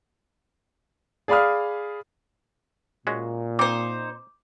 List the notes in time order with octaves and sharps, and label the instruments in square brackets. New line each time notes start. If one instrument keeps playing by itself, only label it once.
[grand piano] G#4 D5 F5 B5 D#6 F6
[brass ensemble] A#2 [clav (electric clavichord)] G#3 C#4 F#4
[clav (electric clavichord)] C4 [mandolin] D#4 C5 [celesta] D6